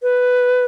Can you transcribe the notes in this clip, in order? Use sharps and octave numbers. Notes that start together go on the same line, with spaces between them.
B4